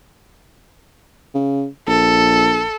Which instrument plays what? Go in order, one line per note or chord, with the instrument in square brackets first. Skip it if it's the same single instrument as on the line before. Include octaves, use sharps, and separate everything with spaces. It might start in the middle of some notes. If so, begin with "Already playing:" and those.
[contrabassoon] C#3
[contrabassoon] A#1 [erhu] A4